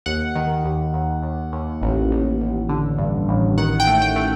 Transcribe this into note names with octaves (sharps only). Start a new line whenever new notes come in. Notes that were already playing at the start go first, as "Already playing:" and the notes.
D#2 F#5
D#3
D#2
D#2
D#2
D#2
A1
A1
A1
D3
G2
A1
D#3 F#5
G5
A3
G5
A3